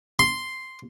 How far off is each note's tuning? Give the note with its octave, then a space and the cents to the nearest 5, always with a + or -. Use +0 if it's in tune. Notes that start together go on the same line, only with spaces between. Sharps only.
C6 +0